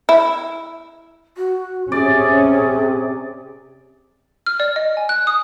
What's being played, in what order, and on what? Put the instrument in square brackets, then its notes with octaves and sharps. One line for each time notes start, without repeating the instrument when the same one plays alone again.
[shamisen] E4
[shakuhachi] F#4
[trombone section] C3 [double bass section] C#4 [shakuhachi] G#4 [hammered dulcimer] D5
[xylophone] F6
D5
D#5
G#5
F#6
D#6